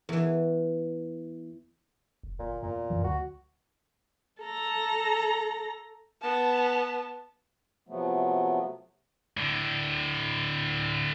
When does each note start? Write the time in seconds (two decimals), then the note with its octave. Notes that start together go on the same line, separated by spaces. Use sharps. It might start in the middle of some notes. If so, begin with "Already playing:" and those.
0.09 E2 E3
2.23 F1
2.39 G1 A#2
2.63 E2 A#2
2.90 F#2 E3 F#3
3.04 D2 F#4
4.42 A4 A#5
6.21 B3 A5
7.89 C3 F3 F#3 A3 B3
9.37 A2 D3